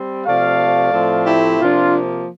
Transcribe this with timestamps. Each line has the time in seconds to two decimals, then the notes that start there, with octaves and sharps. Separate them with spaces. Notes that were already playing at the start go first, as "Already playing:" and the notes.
Already playing: G3 C4
0.26 C3 F3 A3 D5 F5
0.93 A2 F3 A3 C4
1.26 E4 G4
1.60 C3 F3 A#3 D4 F4